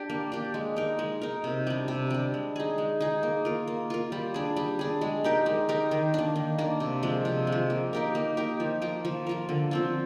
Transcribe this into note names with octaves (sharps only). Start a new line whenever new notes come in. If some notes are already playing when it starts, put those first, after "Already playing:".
Already playing: D4 G4
A#3
D4 G4
G#3
D#4 A#4
G#3
D#4 A#4
C3
G3 D4
C3
G3 D4
G#3
D#4 G#4
G#3
D#4 G#4
A#3
F4 A#4
A#3
F4 A#4
G3
D4 G#4
G3
D4 G#4
G#3
D#4 G4 A#4
G#3
D#4 G4 A#4
D#3
A#3 D4
D#3
A#3 D4
C3
F3 G#3
C3
G#3
F3
A#3
D#4 G4 A#4
A#3
D#4 G4 A#4
F3
A#3 F4 A#4
F3
A#3 F4 A#4
D3
F3 C4 F4